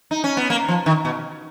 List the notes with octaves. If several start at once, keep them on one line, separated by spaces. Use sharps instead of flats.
D#4
C#4
B3
A#3
F3
D#3
B2